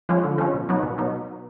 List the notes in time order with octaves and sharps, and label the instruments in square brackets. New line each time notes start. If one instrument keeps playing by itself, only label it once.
[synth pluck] F3 G#3 C#4 F4
D3
F3 G#3 C#4 F4
B2
F#3 B3 D#4
B2
F#3 B3 D#4